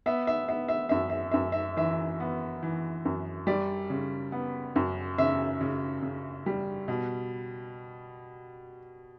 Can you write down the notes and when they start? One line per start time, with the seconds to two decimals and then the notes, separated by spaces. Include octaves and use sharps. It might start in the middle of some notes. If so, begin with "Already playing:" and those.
0.06 B3 E5
0.27 E5
0.48 B3 E5
0.69 E5
0.89 F#2 E5
1.10 E5
1.31 F#2 E5
1.52 E5
1.77 E3 E5
2.20 B3
2.63 E3
3.05 F#2
3.47 G3 D5
3.90 C#3
4.32 B3
4.76 F#2
5.18 C#3 E5
5.61 C#3
6.03 C#3
6.46 G3
6.88 B2